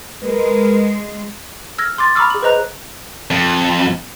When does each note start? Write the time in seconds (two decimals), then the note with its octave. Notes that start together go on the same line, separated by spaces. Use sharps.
0.23 G#3 A#4 B4
1.78 E6 F6 G#6 A#6
1.98 C6 D6 A6
2.15 A#5 B5 C#6 D6 E6 F6
2.30 G#4 F#7
2.42 B4 C5 D#5 A#5 F#6
3.31 F2